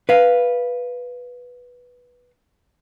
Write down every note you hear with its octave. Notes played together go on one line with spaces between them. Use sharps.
B4 F5